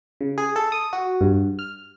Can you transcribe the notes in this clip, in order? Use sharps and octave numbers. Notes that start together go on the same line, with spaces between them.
C#3
G#4
A4
D#6
F#4
G2
F6